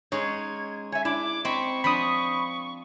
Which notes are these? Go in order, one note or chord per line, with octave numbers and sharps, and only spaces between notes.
G#3 C#4 D#4 G#4 C#5 G#6
C#5 E5 G#5
D4 E4 D6
C4 D#5 B5 C#6
F3 D4 B5 D#6